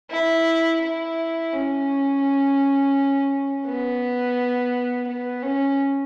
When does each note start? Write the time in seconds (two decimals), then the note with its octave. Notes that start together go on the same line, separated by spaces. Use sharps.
0.10 E4
0.81 E4
1.53 C#4
3.66 B3
5.08 B3
5.43 C#4